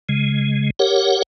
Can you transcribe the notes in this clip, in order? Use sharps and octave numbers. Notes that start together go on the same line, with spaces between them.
C#3 G#3
G4 A#4 C#5 F#5